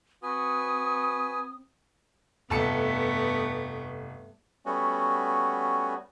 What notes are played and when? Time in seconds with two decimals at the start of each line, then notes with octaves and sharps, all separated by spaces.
0.23 C4 F#4 B4 G#5 D#6
2.50 F1 G2 A3 B3 A5 C#7
4.66 G3 A3 B3 C#4 F#4